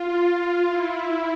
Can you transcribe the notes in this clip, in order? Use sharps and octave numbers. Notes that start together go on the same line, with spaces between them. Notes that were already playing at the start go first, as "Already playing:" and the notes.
Already playing: F4
E4